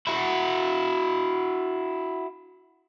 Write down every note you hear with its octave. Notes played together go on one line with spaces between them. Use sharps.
E4 F#4